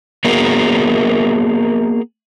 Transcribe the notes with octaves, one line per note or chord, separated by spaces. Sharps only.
A#3 B3 F#4 G#4 A#4